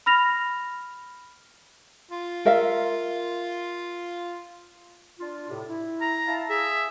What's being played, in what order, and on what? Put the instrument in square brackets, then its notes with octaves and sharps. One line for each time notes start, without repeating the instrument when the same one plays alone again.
[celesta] B5 F6 A#6 F7
[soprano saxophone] F4
[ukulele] A#4 E5 F5
[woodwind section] D4 F4
A2 C3
E4
[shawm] A#5
[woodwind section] E4 F5 A5
[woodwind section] G#4 [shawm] E5